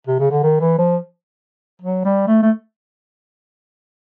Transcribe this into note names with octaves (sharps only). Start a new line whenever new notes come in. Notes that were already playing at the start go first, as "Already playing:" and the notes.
C3
C#3
D3
D#3
E3
F3
F#3
G3
A3
A3